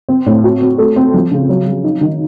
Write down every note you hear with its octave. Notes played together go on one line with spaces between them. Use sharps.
C4
A2
F#4
C4
A3
C4
F3
C#3
F#3
F#3
D#4
D#3